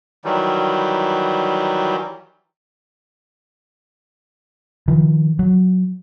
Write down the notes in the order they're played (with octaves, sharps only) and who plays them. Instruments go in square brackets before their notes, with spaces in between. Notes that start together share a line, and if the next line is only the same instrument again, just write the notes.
[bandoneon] D#3 E3 F#3 G3
[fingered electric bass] D#3 F3
F#3